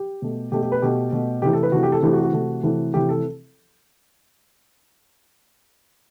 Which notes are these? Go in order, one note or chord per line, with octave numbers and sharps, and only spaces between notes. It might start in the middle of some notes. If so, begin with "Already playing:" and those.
Already playing: G4
B2 A3
B2 A3 G4
G4
B4
B2 A3 G4
B2 A3
C3 E3 A3 G4
A4
B4
C3 E3 A3 F#4
G4
A4
C3 E3 A3 G4
F#4
F#4
C3 E3 A3
C3 E3 A3
C3 E3 A3 G4
A4